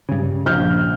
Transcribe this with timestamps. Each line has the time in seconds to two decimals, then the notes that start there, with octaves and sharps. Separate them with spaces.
0.09 G2 C#3
0.46 A#1 F6 G6